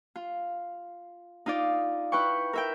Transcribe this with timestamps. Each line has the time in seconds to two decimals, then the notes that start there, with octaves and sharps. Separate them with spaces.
0.15 F4
1.46 D#4 F4 D5
2.12 E4 B4 G5 C#6
2.53 A#4 E5 G5